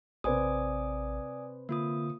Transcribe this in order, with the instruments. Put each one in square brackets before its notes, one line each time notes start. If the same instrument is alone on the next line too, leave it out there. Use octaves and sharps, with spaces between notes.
[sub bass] A1 [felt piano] C3 B4 C5 [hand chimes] D5 G#5 D#6
[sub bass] D3 [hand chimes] A#3 F4 D#6